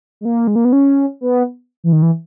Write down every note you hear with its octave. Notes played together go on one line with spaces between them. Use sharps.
G#3
A#3
G#3
A#3
B3
C#4
B3
E3
D#3
E3